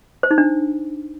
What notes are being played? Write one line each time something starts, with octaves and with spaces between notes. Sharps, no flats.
C5
D#4
D4